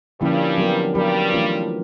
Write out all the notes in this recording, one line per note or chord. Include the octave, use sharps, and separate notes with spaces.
G2 D3 F3 G3 A#3 C#4 E4
F#3 B3 D4 G4 A#4
G2 F#3 G3 B3 D4 G4 A#4
E3 A3 D4 F4